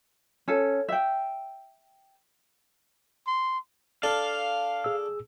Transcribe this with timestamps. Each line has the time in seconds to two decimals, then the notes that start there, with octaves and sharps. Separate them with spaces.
0.48 C#4 A4
0.89 E5 G5
3.27 C6
4.03 D4 A4 F5
4.84 G#4 E6